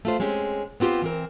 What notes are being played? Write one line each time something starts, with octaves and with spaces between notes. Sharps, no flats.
A3 F4 C5
G#3 C4 C#4 G4
B3 C4 F4 G4
E3 C4 A#4